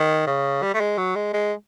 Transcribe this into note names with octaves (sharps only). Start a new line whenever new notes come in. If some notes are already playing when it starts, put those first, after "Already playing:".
Already playing: D#3
C#3
G3
A3
G#3
F#3
G#3
G#3